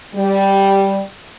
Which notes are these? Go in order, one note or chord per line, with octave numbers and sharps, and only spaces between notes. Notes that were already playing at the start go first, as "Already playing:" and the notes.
G3